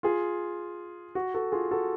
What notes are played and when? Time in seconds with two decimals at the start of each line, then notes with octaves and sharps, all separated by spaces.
0.03 F4 G#4
1.15 F#4
1.34 F#4 A4
1.52 F4 G#4
1.71 F#4 A4